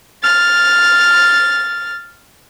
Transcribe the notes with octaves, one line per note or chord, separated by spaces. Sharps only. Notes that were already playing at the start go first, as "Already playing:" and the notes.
F6 A6